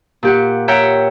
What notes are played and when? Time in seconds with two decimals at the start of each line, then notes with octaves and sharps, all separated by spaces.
0.23 A#2 G4 F#5
0.68 C#5 E5 F#5 G5 A#5